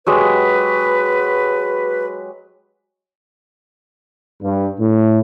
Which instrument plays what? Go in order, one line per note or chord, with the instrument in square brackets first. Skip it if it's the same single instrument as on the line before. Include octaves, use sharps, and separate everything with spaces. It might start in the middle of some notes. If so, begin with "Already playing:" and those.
[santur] F#3 G#3 G4 [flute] B4
[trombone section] G2
A2